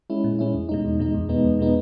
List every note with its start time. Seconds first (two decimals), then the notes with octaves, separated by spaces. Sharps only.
0.10 G#3 C#4 E4
0.24 A#2
0.39 G#3 C#4 E4
0.54 E2
0.69 B2 G#3 D#4
0.85 E2
0.99 B2 G#3 D#4
1.14 E2
1.29 B2 G#3 B3 D#4
1.44 E2
1.59 B2 G#3 B3 D#4